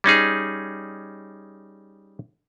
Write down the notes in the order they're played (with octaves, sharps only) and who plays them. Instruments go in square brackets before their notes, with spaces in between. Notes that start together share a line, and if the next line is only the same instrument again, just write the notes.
[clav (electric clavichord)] G3 C#4 D#4 G#4